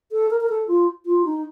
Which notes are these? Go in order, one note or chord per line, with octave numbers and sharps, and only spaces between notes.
A4
A#4
A#4
A4
F4
F4
D#4